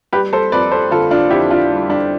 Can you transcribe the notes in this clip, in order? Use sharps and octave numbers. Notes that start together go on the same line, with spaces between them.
G3 G4 B4
A4 C5
F2 B4 D5
A4 C5
D3 F4 A4
D4 F4
F2 E4 G4
D4 F4
G3
D4